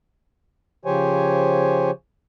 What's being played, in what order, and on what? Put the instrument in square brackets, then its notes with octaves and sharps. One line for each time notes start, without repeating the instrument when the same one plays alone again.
[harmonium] C#3 F3 G4 C5 C#5 G#5